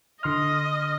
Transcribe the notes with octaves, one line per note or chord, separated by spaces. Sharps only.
D3 D#5 C6 F6